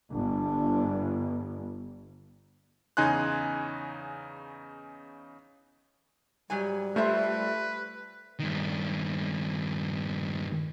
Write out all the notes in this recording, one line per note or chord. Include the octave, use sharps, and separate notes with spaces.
G1 D4
E2 C#3 D#4 G#5 C6 F#6
G#2 F#3 G3 G#5
A3 F4 B4 C5 E5
G2 D#3